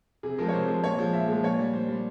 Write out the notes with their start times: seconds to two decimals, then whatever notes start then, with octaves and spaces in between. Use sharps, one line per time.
0.23 C3 G#4
0.38 F3 G#3 A#4
0.48 C#5
0.53 C3 C5
0.68 F3 G#3
0.83 A#2 C#5
0.99 F3 G#3
1.13 A#2 E5
1.28 F3 G#3
1.43 A#2 C#5
1.59 G3
1.73 A#2 C5
1.88 G3